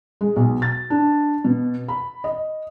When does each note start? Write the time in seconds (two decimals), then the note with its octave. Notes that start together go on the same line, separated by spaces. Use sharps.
0.21 G#3
0.36 B1
0.62 A6
0.90 D4
1.44 B2
1.88 B5
2.24 D#5